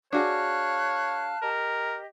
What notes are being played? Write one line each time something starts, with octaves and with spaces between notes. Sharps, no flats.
D4 F#4 G#4 C#5 F5 A5 F6 F#6
G4 A#4 D#5